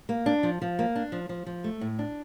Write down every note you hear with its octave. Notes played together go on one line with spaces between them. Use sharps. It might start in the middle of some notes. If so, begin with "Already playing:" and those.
A#3
D4
F3
F3
A#3
D4
F3
F3
F3
A3
A2
D4